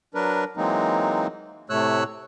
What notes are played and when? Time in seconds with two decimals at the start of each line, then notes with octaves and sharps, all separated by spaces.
0.14 F#3 D4 A#4 B4
0.57 E3 F#3 G#3 A#3 C4 D#4
1.70 A2 C3 A3 C#5 E6 F#6